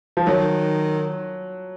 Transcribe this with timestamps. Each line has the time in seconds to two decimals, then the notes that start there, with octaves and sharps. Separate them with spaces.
0.17 F3
0.27 D#3 F#3